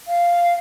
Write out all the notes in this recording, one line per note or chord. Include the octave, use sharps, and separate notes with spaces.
F5